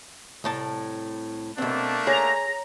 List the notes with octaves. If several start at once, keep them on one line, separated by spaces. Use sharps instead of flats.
C2 A2 A5
B2 A3 A#3 C4 D4
G#4 C#5 A#5